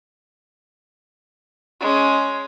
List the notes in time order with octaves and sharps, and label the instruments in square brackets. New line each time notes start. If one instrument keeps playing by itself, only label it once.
[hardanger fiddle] G#3 C#4